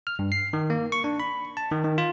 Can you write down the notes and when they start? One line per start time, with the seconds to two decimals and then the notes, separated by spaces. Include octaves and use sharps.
0.07 F6
0.19 G2
0.32 C7
0.53 D#3
0.70 A#3
0.92 C#6
1.04 D4
1.20 B5
1.57 A5
1.72 D#3
1.84 D#3
1.98 F4